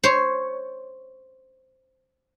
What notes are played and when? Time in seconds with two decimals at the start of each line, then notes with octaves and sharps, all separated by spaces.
0.03 C5 C#5